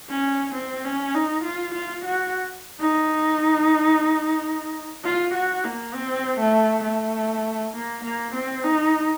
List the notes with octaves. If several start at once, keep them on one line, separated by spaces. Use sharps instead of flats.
C#4
C4
C#4
D#4
F4
F4
F#4
D#4
F4
F#4
A#3
C4
A3
A3
A#3
A#3
C4
D#4